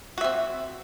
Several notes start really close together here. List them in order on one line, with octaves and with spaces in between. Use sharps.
F#4 E5 C4